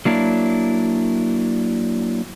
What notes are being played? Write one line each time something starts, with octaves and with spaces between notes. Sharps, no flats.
F#3 A#3 D4 E4